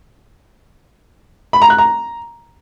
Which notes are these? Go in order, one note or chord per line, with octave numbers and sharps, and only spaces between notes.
B5
A#5
F#6
A#5